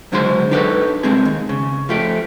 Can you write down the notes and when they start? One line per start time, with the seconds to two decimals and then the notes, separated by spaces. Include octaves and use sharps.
0.12 C#2 D3 F#3 G#3 C5 C6
0.51 D4 D#4 G4 A4 B4 C#5
1.03 C2 C3 G#3 C4 G#4
1.25 D#2
1.49 C#3
1.89 F3 A3 G4